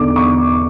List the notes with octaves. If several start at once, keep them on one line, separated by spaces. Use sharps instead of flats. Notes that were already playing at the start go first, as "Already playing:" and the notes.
Already playing: E2 D3 D6
E2 C#6